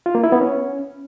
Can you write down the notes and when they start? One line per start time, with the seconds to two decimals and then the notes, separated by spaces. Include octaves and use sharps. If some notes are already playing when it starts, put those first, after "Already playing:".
0.06 F4
0.15 A#3
0.24 E4
0.32 B3
0.41 C#4